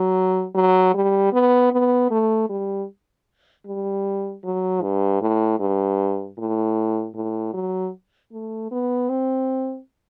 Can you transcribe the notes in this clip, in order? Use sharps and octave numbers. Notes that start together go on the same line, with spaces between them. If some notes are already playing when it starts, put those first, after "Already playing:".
Already playing: F#3
F#3
G3
B3
B3
A3
G3
G3
F#3
G2
A2
G2
A2
A2
F#3
A3
B3
C4